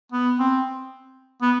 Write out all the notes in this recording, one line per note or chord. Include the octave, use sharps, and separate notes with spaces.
B3
C4
B3